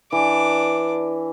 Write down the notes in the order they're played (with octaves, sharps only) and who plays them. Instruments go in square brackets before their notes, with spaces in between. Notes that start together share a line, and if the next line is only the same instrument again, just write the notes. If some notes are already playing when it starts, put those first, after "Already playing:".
[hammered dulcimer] E3 [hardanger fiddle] D4 D6